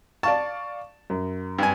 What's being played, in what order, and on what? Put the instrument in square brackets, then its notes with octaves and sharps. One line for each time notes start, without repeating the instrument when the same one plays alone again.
[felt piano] D5 F5 C#6 [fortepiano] A5
[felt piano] F#2
[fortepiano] G2 G#5